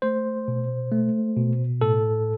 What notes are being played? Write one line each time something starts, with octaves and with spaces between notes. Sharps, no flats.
A3 C5
B2
A3
B2
A2 A4